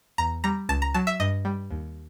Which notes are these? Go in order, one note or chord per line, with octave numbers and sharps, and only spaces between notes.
E2 A#5
G3 A#5
C#2 A5
A#5
F#3 A5
E5
G2 D#5
G3
D#2